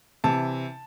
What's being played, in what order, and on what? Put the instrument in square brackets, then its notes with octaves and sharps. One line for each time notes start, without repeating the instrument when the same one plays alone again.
[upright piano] C3 E3 A5